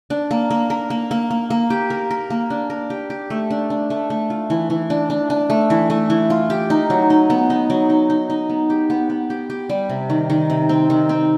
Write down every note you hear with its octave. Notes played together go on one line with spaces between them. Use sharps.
D4
A#3
A#3
A#4
A#3
A#3
A#3
A#3
G4
A#4
A#4
A#3
D4
A#4
G4
G4
A3
D4
D4
A3
A3
F4
E3
E3
D4
D4
D4
A3
E3
A3
E3
F4
G4
D#4
F#3
D#4
B3
D#4
F#3
D#4
D#4
D#4
B3
G4
B3
B3
G4
G4
G3
C3
D#3
D#3
C3
C4
D#3
C4